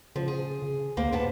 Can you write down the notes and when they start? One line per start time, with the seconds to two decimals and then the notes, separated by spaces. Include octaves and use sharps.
0.16 C#3 F3
0.28 G#4
0.62 C#3
0.97 D2 A#3 C5
1.13 G2 C3 B3 A5